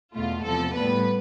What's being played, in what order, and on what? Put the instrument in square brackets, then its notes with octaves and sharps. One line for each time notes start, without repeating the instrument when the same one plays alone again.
[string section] E2 B2 A3 F4
E2 C3 F3 A4
A2 G3 B3 B4